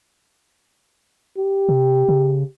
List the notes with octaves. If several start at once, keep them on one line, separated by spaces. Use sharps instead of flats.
G4
C3
C#3